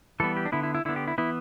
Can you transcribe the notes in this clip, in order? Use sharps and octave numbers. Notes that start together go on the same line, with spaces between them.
E3 G3 B3 A4
G4
D4
D3 B3 E4
E4
E4
D3 B3 E4
G4
E4
E3 B3 E4